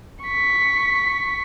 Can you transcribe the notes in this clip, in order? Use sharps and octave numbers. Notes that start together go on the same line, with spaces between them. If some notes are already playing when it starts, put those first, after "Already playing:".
C#6 B6